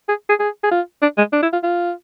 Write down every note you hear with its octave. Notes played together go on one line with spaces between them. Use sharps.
G#4
G#4
G#4
G#4
F4
D4
G#3
D4
E4
F4
F4